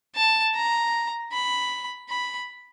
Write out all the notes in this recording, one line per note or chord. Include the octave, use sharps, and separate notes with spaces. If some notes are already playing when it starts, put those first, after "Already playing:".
A5
A#5
B5
B5